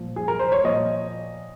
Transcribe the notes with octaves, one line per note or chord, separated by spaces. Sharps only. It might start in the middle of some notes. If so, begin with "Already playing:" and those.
Already playing: A#2 F3
G#4
A#4
C5
C#5
A#2 F3 D#5